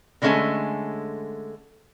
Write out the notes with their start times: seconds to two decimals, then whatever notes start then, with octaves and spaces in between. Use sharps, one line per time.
0.22 D3 D#3 G#3 A3 C#4 G#5